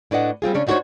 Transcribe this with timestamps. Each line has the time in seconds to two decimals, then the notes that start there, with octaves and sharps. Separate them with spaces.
0.11 A2 D4 B4 D#5 F#5
0.42 G3 C4 F4 G#4
0.54 C#3 C#4 D4
0.67 D4 D#4 F#4 A4 C5 C#5